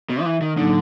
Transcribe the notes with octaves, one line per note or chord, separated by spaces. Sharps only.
B2
F3
E3
D#3
A2 D3 F#3 A#3 D#4